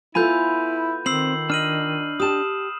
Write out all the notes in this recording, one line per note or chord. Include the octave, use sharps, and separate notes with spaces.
B3 E4 F4 A4 G#5 B5 G6
D#3 C4 E6 C7 F#7
D4 D#5 F6 D#7 F#7
G4 A5 D#6 E7